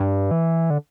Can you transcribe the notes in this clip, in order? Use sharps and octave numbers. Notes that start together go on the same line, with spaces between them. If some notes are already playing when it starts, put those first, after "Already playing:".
Already playing: G2
E3
D3